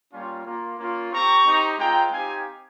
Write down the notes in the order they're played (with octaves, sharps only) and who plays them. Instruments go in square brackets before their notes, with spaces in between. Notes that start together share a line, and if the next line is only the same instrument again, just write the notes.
[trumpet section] G3 A#3 C#4 F4
A#3 F4
A#3 C#4 F4
C4 G4 A#5 C#6
C4 D#4 G4
G#3 C4 F4 G5 A#5
C4 D#4 G4 F5 G#5